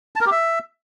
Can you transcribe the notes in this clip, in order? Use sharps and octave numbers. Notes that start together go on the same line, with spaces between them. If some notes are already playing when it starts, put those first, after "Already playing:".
A5
A#4
G4
E5